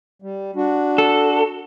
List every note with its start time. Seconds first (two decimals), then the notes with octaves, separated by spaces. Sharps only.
0.22 G3
0.56 D4 F#4
0.98 A4